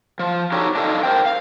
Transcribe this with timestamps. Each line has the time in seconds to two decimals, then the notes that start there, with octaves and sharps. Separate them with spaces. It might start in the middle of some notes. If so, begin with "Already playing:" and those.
0.19 F3
0.52 D4 D#4 F#4 G4 A4 C#5
0.75 D4 D#4 A4 D#5 F5
1.03 A#4 C5 G5
1.26 F5